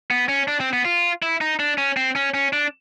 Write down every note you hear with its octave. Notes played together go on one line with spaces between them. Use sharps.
B3
C#4
D4
C4
B3
F4
E4
D#4
D4
C#4
C4
C#4
C#4
D4